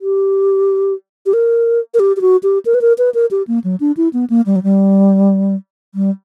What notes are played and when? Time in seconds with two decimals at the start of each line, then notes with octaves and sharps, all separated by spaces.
0.01 G4
1.26 G4
1.33 A#4
1.94 A#4
2.00 G4
2.17 G4
2.21 F#4
2.43 G4
2.66 A#4
2.74 B4
2.81 A#4
2.98 B4
3.14 A#4
3.31 G4
3.48 A#3
3.64 F#3
3.80 D4
3.97 E4
4.13 B3
4.30 A#3
4.46 G3
4.56 F#3
4.63 G3
5.95 G3